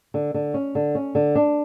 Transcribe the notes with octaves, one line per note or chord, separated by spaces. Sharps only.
D3
D3
C#4
D3
C#4
D3
D4